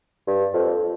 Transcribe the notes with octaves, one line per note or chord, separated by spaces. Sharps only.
G2
F2